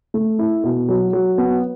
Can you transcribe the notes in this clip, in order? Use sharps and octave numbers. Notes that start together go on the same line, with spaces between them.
A3
E4
B2
F#3
F#3
B3